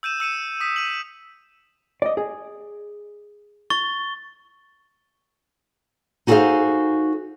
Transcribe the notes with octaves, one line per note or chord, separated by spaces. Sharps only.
E6 G6 D#7 E7
E6 C#7 D#7 E7
D#6 B6
D#7 F#7
D5 D#5
G#4
C#6 A6 G7
D#4 F#4 G#4 A4 C5 F5